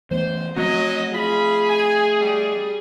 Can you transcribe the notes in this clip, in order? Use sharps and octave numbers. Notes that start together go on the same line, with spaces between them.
E3 A3 B3 C5
F3 F#3 A3 C4 D#5
F4 G#4 B5
G#5
G3